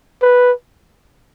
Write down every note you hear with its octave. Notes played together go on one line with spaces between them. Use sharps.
B4